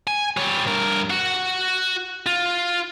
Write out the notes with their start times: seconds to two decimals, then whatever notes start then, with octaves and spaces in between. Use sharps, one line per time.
0.07 G#5
0.37 G3 C#5
0.66 G2 A#4
1.10 F#4 F#5
2.26 F4